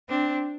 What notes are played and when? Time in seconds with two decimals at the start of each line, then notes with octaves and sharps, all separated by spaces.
0.10 C4 D4